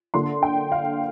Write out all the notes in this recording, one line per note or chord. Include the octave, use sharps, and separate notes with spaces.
D3 A#3 D4 C6
G5
F5